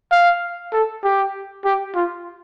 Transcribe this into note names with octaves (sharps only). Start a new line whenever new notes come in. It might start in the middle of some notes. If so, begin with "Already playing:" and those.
F5
A4
G4
G4
F4